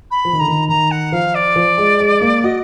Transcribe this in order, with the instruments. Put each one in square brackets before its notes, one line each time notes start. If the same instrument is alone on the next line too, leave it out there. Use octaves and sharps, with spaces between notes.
[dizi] B5
[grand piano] F3
D#3
[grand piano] D3 [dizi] A#5
[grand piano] D#3
[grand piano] D#3 [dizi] A#5
[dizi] F#5
[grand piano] F3 [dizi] F5
[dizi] D5
[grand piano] F3
G#3
G#3
A#3
[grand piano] F#4 [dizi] D#5